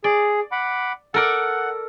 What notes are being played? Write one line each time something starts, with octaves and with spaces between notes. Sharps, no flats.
G#4 D5
F#5 B5 D6
A4 A#4 D5 F#5